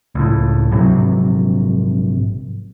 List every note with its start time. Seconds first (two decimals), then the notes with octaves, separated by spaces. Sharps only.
0.15 C#2 A2
0.71 A#1 G#2 C3 F#3